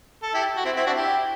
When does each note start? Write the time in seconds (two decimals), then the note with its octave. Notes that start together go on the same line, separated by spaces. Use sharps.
0.23 A4
0.34 E4 G4
0.57 F#4
0.65 C4 E4
0.76 C4 E4
0.86 D4 F#4
0.97 E4 G4